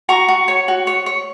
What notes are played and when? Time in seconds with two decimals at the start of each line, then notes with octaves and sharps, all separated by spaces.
0.09 F#4 A#5 C#6
0.28 F#4
0.48 C#5
0.68 F#4
0.87 C#5
1.06 C#5